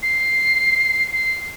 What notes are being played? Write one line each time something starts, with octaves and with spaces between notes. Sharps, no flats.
C7
C7